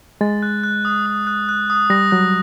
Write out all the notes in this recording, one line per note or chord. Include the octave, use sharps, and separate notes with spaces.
G#3 A6
F#6
F#6
D#6
D#6
F#6
F#6
D#6
G3 A#6
F#3 F#6